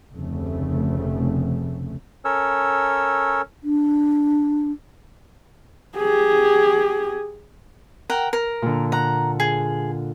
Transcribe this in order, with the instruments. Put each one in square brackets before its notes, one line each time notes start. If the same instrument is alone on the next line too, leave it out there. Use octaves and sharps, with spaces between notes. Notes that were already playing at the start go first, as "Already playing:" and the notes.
[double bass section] F1 D2 C#3 A3
[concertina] C#4 A4 A#4 C#5 E6
[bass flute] D4
[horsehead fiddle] G4 G#4
[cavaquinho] A#4 F#5 G5
A#4
[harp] A#2 D3
[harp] F#5 F#6 [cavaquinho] A#5
[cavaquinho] G#4